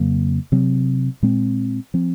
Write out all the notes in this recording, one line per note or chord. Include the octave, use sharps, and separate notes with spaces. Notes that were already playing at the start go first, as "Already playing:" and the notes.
Already playing: F2 C#3 F#3 A#3
C3 F#3 C4
A#2 G#3 C4
F3 C4